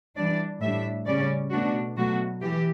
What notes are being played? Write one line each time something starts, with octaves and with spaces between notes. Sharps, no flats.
E3 G3 D4 D5
A2 G3 D4 E5
C#3 G3 C#4 D5
B2 A3 D4 F#4
B2 F#3 A3 F#4
E3 G4